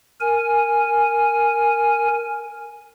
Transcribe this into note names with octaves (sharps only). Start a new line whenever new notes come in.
A#4 G#5